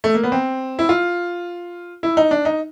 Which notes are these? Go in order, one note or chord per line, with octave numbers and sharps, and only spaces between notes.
A3
A#3
B3
C4
E4
F4
E4
D#4
D4
D#4